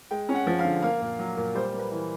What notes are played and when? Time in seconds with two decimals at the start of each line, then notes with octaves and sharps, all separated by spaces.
0.11 G#3 G5
0.29 C#4
0.34 F#5
0.47 F3
0.59 F5
0.65 D3
0.82 A#3 F5
1.01 A#2
1.19 F#3
1.37 A#2
1.55 G3 C5
1.73 A#3
1.79 B4
1.92 E3